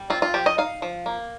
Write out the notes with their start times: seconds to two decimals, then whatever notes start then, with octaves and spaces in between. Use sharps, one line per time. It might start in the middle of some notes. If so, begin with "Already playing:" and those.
Already playing: G3
0.10 C4 F4
0.22 F4
0.34 F3 G4
0.46 D#5
0.58 D#4 F5
0.82 F3
1.06 A#3